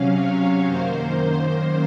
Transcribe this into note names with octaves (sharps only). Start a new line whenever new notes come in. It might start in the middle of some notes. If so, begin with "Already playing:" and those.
Already playing: C3 F#3 C#4 F5
C#5
F#2 D#3 A#3 C5